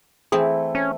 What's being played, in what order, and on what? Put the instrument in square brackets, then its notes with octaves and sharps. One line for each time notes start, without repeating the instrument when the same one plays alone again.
[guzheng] E3 C4 E4 [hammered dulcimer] A3 [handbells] G#4
[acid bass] C#4